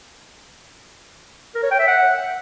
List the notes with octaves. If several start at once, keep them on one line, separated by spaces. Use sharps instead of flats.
A#4
C#5
G5
E5
F#5